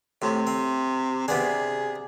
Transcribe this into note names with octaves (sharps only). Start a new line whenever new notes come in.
A2 C3
C4
C3 B3 D4 G#4